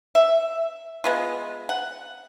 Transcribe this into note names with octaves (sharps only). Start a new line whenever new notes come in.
E5
G#3 B3 F4
F#5